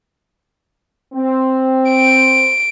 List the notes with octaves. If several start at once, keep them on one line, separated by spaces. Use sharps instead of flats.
C4
D7